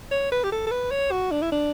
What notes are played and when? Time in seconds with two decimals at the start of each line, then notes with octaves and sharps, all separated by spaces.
0.11 C#5
0.32 B4
0.44 G4
0.52 A4
0.67 A4
0.71 B4
0.91 C#5
1.11 F#4
1.31 D4
1.42 E4
1.52 D4